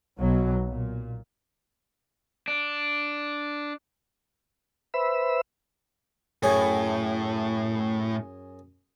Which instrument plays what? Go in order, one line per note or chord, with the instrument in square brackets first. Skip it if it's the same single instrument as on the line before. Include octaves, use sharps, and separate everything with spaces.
[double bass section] B1 B2 F#3
A#2
[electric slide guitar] D4
[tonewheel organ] B4 C5 E5 B5 E6
[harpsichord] F#2 G#4 C#5 [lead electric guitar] A2